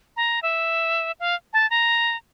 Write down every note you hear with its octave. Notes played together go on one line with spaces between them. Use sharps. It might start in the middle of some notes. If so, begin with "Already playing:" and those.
A#5
E5
F5
A5
A#5